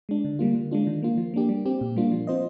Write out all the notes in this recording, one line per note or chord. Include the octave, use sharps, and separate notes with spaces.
G#3 D4
D3
G3 A#3 F4
D3
G#3 D4 F4
D#3
A#3 F4
F3
A#3 D4 G4
G3
C4 G4
A#2
G3 A#3 D4 F4
F3
C4 F4 C5 D#5